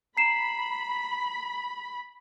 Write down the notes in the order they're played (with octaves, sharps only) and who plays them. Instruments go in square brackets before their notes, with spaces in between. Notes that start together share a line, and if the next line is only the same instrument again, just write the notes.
[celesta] A#5 C7 E7 [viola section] B5